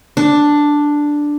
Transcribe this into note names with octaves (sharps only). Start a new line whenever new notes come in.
D4